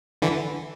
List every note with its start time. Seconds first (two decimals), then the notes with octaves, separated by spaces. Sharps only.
0.22 D3 E3